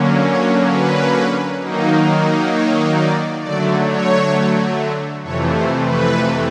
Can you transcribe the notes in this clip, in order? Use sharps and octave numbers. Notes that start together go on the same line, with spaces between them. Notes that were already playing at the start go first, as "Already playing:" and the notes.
Already playing: D3 F#3 A#3 C#4
C#5
B4
D#3 F#3 A#3 D#4
C#5
D5
D3 F#3 A3 D5
C#5
F2 C3 E3 A3 C#5
C5
B4